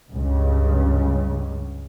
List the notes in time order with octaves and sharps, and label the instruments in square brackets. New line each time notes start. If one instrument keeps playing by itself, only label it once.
[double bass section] C#2 G2 C#3